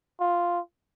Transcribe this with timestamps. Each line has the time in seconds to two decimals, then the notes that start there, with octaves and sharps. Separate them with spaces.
0.20 F4